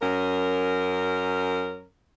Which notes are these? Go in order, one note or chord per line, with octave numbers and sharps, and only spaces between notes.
F#2 C#4 A#4